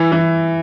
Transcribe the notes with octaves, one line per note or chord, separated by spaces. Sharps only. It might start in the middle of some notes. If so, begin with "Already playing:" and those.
Already playing: E3
E3